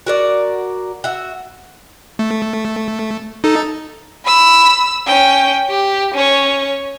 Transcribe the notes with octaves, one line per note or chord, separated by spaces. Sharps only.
F#4 A#4 D5
F#4 E5
A3
D#4 A4
B5 E6
C#4 G5
G4
C#4 C#5